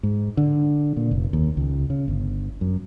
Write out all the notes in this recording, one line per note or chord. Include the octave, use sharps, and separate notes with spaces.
G#2
D3
A#2
F1
D#2
C#2
C#3
G1
F#2